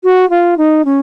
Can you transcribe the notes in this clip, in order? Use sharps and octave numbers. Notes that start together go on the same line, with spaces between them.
F#4
F4
D#4
C#4